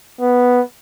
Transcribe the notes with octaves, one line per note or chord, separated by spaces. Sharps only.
B3